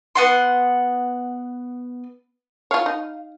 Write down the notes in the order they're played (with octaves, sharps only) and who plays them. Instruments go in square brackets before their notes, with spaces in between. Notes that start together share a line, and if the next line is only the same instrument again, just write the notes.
[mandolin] B3 F#5 C6
[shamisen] F4 C#5 [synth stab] F5
[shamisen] D#4